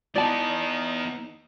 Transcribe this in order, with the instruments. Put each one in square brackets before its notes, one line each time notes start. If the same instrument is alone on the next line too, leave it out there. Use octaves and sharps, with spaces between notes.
[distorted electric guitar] E3 B3 [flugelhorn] D#4 [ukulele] D5 A5